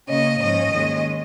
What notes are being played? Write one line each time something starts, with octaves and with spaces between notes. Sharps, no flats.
C#3 A#3 C#4 D#5
G#2 F3 C#4 D#5
D#2 D#3 G#3 C#4